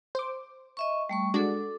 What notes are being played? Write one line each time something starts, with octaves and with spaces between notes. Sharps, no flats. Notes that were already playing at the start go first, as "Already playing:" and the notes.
C5 D6
D#5 E5 C#6
G3 A3 C#6
G#3 D4 F#4 A4 D6